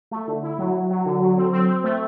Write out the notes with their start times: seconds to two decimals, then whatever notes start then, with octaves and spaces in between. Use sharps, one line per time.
0.11 A3
0.28 D3
0.43 E4
0.59 F#3
0.74 F#3
0.91 F#3
1.06 D3
1.22 F#3
1.37 C4
1.53 C4
1.69 C4
1.84 A3